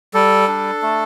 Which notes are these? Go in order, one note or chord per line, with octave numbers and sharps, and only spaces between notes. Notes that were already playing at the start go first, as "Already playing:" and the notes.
G3 A4
D4
A3